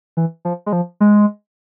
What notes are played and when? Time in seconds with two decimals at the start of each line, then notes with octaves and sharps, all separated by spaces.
0.17 E3
0.45 F3
0.66 G#3
0.73 F3
1.00 G#3